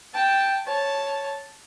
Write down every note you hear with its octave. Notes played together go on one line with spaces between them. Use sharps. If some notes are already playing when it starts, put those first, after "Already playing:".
G5 A5
C#5 A5